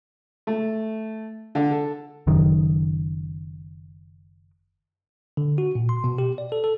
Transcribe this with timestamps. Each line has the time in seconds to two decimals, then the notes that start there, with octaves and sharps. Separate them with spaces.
0.47 A3
1.55 D3
1.71 A4
2.27 F#1 F#2 D#3
5.37 D3
5.58 F#4
5.75 A#2
5.89 C6
6.04 B2
6.18 G4
6.38 D5
6.52 A4
6.64 A4